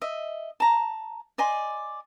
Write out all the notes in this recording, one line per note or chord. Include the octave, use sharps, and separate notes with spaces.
D#5 E5
A5 A#5
D5 D#5 G#5 C6